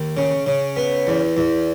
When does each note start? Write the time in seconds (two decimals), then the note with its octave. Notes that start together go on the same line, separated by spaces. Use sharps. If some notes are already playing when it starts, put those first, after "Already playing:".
Already playing: D#2
0.17 C#3
0.46 C#3
0.76 B3
1.07 E2
1.37 E2